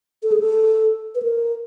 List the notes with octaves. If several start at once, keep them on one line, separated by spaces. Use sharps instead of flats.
A4
G#4
A4
B4
A#4